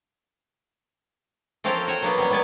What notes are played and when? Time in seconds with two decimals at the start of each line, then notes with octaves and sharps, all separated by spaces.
1.64 F3 C4 C#4 G4 A4 A#4
1.87 F#4 C#5 G5
2.02 F#3 A#3 B3
2.18 G3 B3 C#4
2.30 F#3 G3 B3 D5 G#5